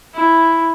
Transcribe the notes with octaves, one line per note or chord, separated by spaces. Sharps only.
E4